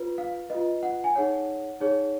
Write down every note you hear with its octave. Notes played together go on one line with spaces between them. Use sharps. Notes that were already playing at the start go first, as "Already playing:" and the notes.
Already playing: F4 B4
F5
F4 B4 D#5
F#5
G#5
D#4 G#4 C#5 F#5
D#4 G#4 C#5